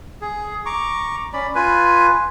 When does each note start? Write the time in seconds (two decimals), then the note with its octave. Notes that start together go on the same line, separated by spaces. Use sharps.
0.22 G#4
0.66 A#5 C#6 D6
1.33 C#4 D5 B5
1.55 F4 B4 G#5